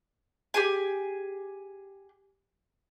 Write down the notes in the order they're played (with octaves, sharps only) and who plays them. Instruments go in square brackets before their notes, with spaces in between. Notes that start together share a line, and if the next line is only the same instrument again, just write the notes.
[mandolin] G4 G#4 G#5